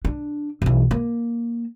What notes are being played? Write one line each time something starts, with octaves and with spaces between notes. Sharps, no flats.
D4
B1 E3
A#3